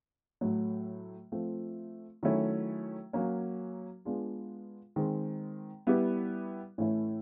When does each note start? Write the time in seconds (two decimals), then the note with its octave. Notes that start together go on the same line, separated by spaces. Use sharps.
0.41 A2 F#3 A3
1.32 F3 A3 C4
2.23 D#3 F#3 A3 C#4 E4
3.13 F#3 A#3 C#4
4.05 G#3 B3 D4 F4 G#4
4.96 D#3 G#3 C4
5.87 G3 B3 E4 G4
6.78 A2 E3 A3 C#4 E4